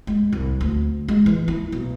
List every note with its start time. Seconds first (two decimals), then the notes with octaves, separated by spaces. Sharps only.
0.07 G#3
0.32 C2
0.61 D2
1.08 G#3
1.26 E3
1.48 E4
1.72 B1